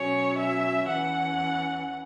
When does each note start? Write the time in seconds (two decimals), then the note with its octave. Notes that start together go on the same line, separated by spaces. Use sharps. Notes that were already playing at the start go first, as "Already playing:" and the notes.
Already playing: B2 F#3 C#4 C#5
0.38 E5
0.88 E2 E3 C#4 F#5